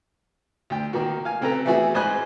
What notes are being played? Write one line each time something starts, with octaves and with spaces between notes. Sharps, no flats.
D2 G5
D#3 A#3 F#4
F5 G#5
C#3 C4 A4 B4 A#5
E3 A3 B3 E4 F#4 G#4
G#2 C5 D#5 G#5 B5 F#6